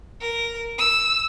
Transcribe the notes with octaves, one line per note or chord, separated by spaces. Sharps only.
A#4
E6